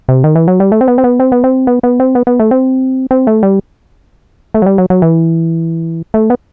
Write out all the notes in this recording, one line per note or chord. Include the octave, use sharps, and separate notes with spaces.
C3
D#3
E3
F#3
G3
A3
C4
B3
C4
B3
C4
B3
C4
B3
B3
C4
B3
B3
A3
C4
C4
A3
G3
A3
F#3
G3
F#3
F#3
E3
A3
B3